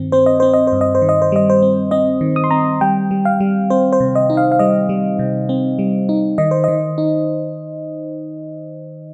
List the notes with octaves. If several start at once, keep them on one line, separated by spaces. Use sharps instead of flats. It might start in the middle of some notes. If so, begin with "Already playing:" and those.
Already playing: G2 D#3 C4
C4 C5
D#5
C4 C5
D#5
C5
G2
D#5
C5
D#3
D#5
C5
G3 D#5
C5
C4
C4 D#5
D#3
D#6
C6
C4 A#5
G3 G5
G3
F5
G3
C4 C5
C5
C3
D#5
D#4
F5
F5
G3 D#5
G3
C3
C4
G3
D#4
D#3 D#5
C5
D#3 D#5
D#4